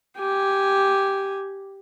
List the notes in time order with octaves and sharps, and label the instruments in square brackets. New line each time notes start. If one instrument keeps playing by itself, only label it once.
[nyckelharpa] G4 G#5